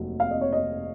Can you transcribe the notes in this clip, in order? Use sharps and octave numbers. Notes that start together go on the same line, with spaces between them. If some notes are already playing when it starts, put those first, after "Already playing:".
Already playing: F1 D#2 F#3
F5
D#5
C#5
D#5